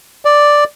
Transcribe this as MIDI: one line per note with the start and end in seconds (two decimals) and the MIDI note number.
0.25 0.64 74